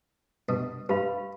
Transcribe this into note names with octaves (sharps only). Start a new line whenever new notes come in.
G2 B2
G2 G4 B4 F5 B5